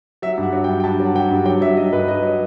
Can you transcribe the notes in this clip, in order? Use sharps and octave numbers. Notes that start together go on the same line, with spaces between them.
F#3 E5
G2
F#5
F#3
G5
G2
G5
G2 A5
F#3
F#5
F#3 G5
G2
F#3 G5
F#3 E5
F#3 D#5
G2 B4
F#3 D#5
F#3